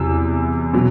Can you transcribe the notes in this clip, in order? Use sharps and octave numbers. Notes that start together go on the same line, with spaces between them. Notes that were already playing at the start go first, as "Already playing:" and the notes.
Already playing: E2 C3 F#3 E6
B2 F#3